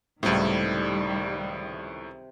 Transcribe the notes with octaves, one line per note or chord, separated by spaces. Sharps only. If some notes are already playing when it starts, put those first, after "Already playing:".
C#2 A2 C3 D#3 G3 E4 A4